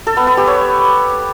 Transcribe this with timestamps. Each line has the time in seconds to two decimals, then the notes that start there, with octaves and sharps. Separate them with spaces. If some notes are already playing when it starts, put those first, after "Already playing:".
0.07 A4
0.17 B3
0.27 B3
0.37 G4
0.47 C#5